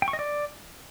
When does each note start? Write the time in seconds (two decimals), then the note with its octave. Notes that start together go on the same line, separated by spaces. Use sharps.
0.02 G5
0.08 C#6
0.13 D#5
0.19 D5